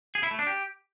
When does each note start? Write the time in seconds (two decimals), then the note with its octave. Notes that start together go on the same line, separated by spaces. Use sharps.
0.15 G#4
0.23 E4
0.31 A3
0.39 D4
0.47 G4